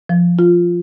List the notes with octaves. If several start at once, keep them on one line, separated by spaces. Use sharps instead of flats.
F3
F4